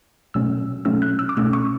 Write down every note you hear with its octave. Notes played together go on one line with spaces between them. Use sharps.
B2 F#3 A3 C#4 E6
B2 F#3 A3 C#4 E6
F#6
E6
D6
B2 A3 C#4 E6
C#6